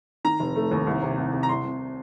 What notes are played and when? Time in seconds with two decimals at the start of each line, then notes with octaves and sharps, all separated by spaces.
0.24 D#3 A#5
0.40 F1
0.56 A3
0.71 D#2
0.87 C2
1.02 C3
1.18 C2
1.33 C3
1.43 A#5
1.49 C2 C6
1.64 C2